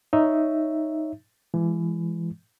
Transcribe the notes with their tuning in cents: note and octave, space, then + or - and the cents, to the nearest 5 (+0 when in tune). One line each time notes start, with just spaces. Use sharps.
D#4 +0 C#5 +5 E5 +0
E3 +30 G#3 +0